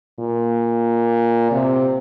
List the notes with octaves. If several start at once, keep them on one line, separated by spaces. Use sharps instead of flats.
A#2
C3